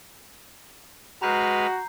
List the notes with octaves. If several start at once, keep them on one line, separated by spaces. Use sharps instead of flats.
G#3 F#4 B4 A#5 F6 G6 C7